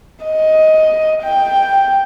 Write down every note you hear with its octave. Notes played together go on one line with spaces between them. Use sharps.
D#5
G5